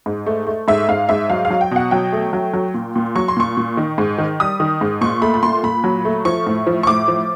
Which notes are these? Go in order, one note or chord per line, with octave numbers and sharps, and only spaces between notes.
G#2
A3
A3
G#2 E5
G#2 F5
G#2 E5
F#3 F5
F5
F#3
G5
B2 F#5
F#3 G5
A3
F#3
F#3
A#2
A#2
F#3 C#6
C6
A#2 C#6
A#2
D#3
G#2
D#3
G3 D#6
D#3
G#2
A#2 C#6
A3 B5
B5
A#2 C6
A#2 B5
F#3
A3
F3 C#6
A2
F3
C#6
A2 D6
F3